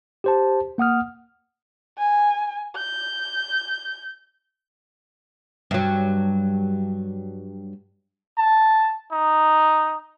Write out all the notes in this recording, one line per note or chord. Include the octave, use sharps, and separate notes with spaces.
G4 C5 A5
A#3 F#5 D#6 F6
G#5
G6
G2 F#3
A5
D#4